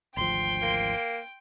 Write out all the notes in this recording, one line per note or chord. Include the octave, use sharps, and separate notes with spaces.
G#1 D2 F3 G5 C6
A#3